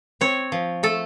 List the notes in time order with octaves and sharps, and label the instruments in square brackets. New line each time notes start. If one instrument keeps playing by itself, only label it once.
[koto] C4 C#5
F3
A3 A4